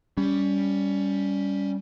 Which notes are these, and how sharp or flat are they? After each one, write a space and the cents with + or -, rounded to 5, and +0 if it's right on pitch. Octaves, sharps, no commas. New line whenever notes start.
G3 +5 C#4 +20